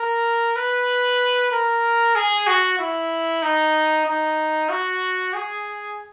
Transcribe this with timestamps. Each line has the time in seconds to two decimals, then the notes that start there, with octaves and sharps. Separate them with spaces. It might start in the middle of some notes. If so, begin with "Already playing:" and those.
Already playing: A#4
0.56 B4
1.51 A#4
2.15 G#4
2.47 F#4
2.79 E4
3.42 D#4
4.06 D#4
4.69 F#4
5.34 G#4